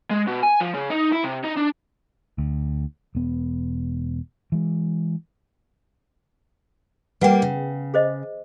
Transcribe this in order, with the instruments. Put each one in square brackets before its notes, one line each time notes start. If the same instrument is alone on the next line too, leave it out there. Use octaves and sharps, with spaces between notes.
[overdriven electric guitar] G#3
B2
G#5
F3
C#3
D#4
E4
C3
D#4
D4
[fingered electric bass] D2
E1 B3
E3 G#3
[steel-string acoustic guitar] G3 A#3 [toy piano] B4 F#5 G5
[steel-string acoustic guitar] C#3
[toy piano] G#4 C5 D#5